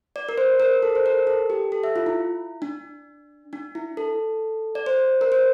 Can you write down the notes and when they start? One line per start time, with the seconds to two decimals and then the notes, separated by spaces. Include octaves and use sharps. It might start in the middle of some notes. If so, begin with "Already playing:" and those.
0.16 D5
0.29 A#4
0.38 C5
0.60 A#4
0.82 A4
0.95 C5
1.06 A#4
1.27 A4
1.50 G4
1.72 A4
1.84 E5
1.96 F4
2.06 E4
2.62 D4
3.53 D4
3.75 E4
3.97 A4
4.75 D5
4.86 C5
5.21 A#4
5.32 C5